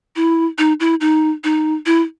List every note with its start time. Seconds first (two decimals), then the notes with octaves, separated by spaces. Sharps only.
0.16 E4
0.58 D#4
0.80 E4
1.01 D#4
1.44 D#4
1.86 E4